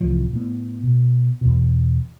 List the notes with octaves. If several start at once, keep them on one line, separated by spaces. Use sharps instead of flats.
C2 A2 E3 F3
A2 B3
B2
E2 B2